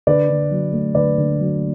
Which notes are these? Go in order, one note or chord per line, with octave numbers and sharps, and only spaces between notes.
D3 B4 D5
D3
F#3
A3
D3 B4 D5
D3
F#3